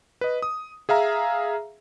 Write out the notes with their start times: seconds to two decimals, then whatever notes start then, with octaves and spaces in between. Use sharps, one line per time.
0.21 B4 D#5
0.42 D#6
0.89 G#4 E5 F5 A#5